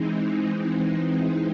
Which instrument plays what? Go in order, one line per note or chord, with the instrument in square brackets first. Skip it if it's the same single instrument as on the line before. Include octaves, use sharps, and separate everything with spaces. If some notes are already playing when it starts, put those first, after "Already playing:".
Already playing: [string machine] E3 G#3 C4 D#4